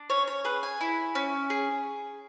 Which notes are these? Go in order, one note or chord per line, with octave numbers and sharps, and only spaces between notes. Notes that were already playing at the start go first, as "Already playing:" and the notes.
Already playing: D4
C#4 C#5
C#5
G#4 B4
G#5
E4
C#4
G#4